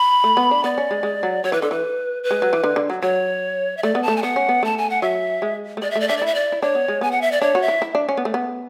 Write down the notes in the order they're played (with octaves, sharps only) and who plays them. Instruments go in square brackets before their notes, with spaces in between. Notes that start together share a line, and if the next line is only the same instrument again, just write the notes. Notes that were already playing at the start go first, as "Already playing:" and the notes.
Already playing: [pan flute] B5
[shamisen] A3
B3
D4
[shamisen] B3 [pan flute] D5
[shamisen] C#4
G#3
G#3
F#3
[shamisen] F#3 [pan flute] C#5
[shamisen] E3 [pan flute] B4
[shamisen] D3 [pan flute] A4
[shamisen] E3 [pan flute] B4
[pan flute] B4
[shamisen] G#3
F#3
E3
D3
D3
F#3
[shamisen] F#3 [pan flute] C#5
[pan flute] E5
[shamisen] A3 [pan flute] D5
[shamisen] B3
[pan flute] A5
[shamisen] A3
[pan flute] G#5
[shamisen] B3 [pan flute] F#5
[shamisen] C#4
B3
[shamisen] A3 [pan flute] A5
[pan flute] G#5
F#5
[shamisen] F#3 [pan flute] E5
[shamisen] G#3
A3
[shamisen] G#3 [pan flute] D5
[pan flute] E5
[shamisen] A3 [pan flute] D5
[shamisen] D4 [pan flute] E5
[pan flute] D5
[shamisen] E4 [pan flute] E5
[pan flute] D5
[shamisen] E4
[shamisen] D4 [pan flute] C#5
[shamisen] B3
G#3
[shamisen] B3 [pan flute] G#5
[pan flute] F#5
E5
D5
[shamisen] D4 [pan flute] C#5
[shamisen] F#4
[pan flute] E5
[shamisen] E4
E4
D4
C#4
B3
A3
B3